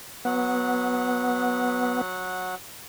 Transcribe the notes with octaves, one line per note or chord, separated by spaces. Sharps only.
F#3 B3 F#5